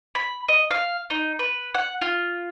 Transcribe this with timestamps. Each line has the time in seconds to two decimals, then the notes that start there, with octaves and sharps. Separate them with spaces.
0.15 B5
0.48 D#5
0.71 F5
1.10 D#4
1.39 B4
1.75 F#5
2.01 F4